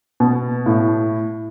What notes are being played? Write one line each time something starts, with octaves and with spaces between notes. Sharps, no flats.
B2
A2